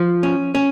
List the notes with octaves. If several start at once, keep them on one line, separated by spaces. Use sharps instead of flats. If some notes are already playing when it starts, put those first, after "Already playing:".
Already playing: F3
C#4
C#4